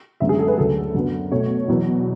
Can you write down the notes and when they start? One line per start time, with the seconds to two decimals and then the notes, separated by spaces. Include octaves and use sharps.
0.20 F#2 D3 G#3 B3 E5
0.29 G#4
0.39 A4
0.48 B4
0.58 D2 C#3 F#3 A4
0.94 F#2 D3 F#3 B3
1.32 B2 A3 C#5
1.68 E2 B2 F#3 B3